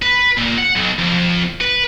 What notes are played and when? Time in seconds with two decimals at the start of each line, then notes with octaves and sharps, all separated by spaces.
0.02 B4
0.38 A#2
0.58 F#5
0.76 B1
0.99 F2
1.61 B4